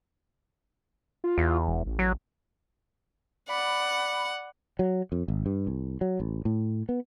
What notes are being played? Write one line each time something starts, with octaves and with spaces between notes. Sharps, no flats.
F4
E2
E1
A1
F#3
D5 F#5 B5
F#3
F2
G#1
G2
C2
F#3
A1
A2
B3